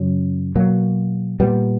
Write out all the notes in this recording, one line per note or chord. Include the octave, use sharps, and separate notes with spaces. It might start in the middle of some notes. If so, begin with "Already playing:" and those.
Already playing: F#2 C#3 F#3 C#4
B2 F#3 A#3
A#2 G3 B3